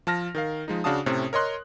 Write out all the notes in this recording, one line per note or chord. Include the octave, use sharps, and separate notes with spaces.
F3 A5 F6 A#6
D#3 A#4 F5
F3 G#3 D#4
C#3 D4 F#4 F5 A5 D#6
A2 C3 C#4
A#4 C#5 D#5 C6 F#6